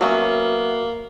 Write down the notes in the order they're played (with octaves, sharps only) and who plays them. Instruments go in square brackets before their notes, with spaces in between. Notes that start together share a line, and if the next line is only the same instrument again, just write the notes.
[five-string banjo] F#3 B3 C#4 [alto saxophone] A#3 [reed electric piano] F#4 E5